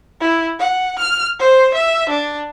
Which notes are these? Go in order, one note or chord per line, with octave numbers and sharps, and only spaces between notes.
E4
F#5
F6
C5
E5
D4